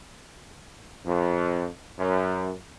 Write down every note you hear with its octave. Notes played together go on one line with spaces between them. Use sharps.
F2
F#2